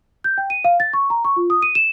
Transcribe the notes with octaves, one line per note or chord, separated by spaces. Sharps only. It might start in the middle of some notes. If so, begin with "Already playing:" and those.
G6
G5
D#7
F5
A6
C#6
A#5
C#6
F4
D#6
D#7
E7